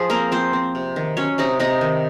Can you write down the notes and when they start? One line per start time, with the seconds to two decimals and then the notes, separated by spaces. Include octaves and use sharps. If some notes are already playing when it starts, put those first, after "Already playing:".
Already playing: F3 G#4
0.10 A#3 C4 A#4
0.32 F3 C4 C5
0.53 C4
0.75 C3
0.96 D#3
1.17 F#3 C#4 C#5
1.38 C3 D#4 D#5
1.60 C3 D#4 D#5
1.81 D#3